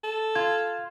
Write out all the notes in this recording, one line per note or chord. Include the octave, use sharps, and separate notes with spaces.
A4
F4 G#6